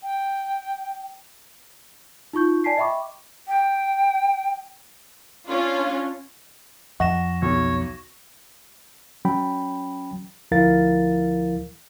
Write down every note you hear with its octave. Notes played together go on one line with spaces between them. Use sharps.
G5
D#4 F4 C#6 G6
D5 G#5 A5 B6 C7
D#5 E5 G5 B5 C#6 D6
G5
C#4 D4 F4 C#5
F2 F3 D#5 F#5 C#6 A#6 E7
B1 C#5
F#3 C#4 G5 B5
D2 F3 E4 A#4 F5 A6